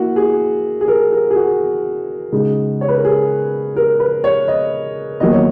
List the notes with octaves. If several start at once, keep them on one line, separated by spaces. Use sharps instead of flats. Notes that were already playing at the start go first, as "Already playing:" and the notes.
Already playing: A#3 E4 F#4
G#4
G#4
A#4
A#4
G#4
F#4
C#3 G#3 D#4
C#5
B4
A#4
G#4
A#4
B4
C#5
D#5
E2 D#3 F#3 A#3 D#5
C#5